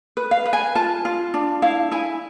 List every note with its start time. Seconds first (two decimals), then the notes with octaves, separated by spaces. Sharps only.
0.17 B4
0.31 F5
0.45 B4
0.53 G#5
0.75 F4 A5
1.05 F4
1.34 D4
1.62 E4 F5
1.91 E4 G#5